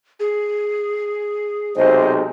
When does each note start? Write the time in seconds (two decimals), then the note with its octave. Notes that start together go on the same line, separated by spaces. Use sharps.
0.20 G#4
1.77 B1 C3 G#3 C5 D#5